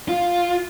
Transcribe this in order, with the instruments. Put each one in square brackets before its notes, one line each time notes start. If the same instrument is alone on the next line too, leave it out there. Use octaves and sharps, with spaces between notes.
[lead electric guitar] F4